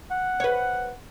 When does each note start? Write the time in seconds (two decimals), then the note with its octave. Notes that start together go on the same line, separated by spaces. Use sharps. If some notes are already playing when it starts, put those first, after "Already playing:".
0.11 F#5
0.40 B4 C#5